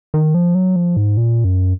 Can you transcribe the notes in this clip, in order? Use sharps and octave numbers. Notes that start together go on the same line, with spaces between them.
D#3
F3
F#3
F3
G#2
A#2
F#2